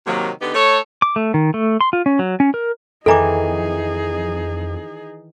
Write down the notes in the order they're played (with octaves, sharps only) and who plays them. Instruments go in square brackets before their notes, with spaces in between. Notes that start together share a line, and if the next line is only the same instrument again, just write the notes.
[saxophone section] C3 D#3 F#3 A#3
D3 B3 D#4 G4
A3 A4 C#5
[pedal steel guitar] D6
A3
D#3
A3
C6
F4
C#4
F#3
C#4
A#4
[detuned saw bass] F2 [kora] D#3 E3 [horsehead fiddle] D#4 G#4 [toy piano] A4 A#5 D6